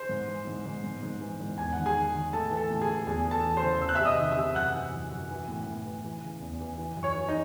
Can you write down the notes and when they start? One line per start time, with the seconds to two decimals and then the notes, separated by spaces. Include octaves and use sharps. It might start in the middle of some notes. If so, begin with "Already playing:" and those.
Already playing: C5 C6
0.09 G#2
0.28 E3
0.47 G#2
0.65 G#2
0.84 G#2
1.03 G#2
1.21 E3
1.40 G#2
1.58 E2 G#5
1.73 D#3 F#5
1.86 G#4 G#5
1.95 D#3
2.14 D#3
2.33 A2 A4 A5
2.51 E3
2.57 A4 A5
2.70 A2
2.82 G#4 G#5
2.88 E3
3.07 E2 G#4 G#5
3.26 E3
3.31 A4 A5
3.44 E3
3.57 C5 C6
3.63 C#3
3.82 E2 E6
3.89 F#6
3.95 E5 E6
3.99 C3
4.05 D#5 D#6
4.18 D#3
4.31 E5 E6
4.36 C3
4.55 F#2 F#5 F#6
4.75 E3
4.93 F#2
5.11 F#2
5.31 E3
5.48 A2
5.67 A2
5.86 E3
6.05 E3
6.23 C#3
6.41 E2
6.60 E3
6.78 E3
6.97 F#2
7.03 C#5 C#6
7.15 E3
7.29 D#4 D#5